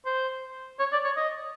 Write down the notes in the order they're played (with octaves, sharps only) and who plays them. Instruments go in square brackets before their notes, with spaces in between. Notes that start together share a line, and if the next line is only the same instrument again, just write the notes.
[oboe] C5
C#5
D5
C#5
D#5